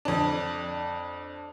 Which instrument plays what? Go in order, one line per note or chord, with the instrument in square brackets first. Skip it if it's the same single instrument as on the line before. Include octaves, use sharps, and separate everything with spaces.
[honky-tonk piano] F2 D4